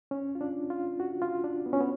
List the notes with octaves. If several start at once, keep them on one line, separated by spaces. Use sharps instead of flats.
C#4
F4
D4
F4
F#4
F4
D4
B3
C#4
B3